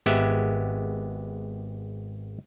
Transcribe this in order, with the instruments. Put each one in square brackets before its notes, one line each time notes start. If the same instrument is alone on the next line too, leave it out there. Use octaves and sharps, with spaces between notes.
[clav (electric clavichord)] G#1 G#3 B3 G4 E5